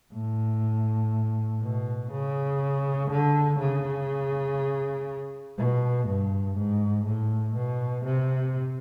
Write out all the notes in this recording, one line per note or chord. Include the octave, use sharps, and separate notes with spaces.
A2
B2
C#3
D3
C#3
B2
G2
G#2
A2
B2
C3